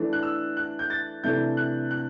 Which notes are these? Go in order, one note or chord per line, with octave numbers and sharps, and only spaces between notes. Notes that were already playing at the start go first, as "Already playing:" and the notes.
Already playing: E3 A3 D4
F#6
E6
F#6
G6
A6
C3 E3 A3 D4 G6
F#6
F#6